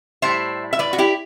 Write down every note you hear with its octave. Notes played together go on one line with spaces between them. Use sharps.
A2 G3 C5 E5
E5
B4 D5
F#4
E4 G4